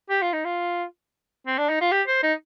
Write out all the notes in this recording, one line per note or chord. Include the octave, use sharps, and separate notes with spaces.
G4
F4
D#4
F4
C4
D4
D#4
F4
G4
C5
D#4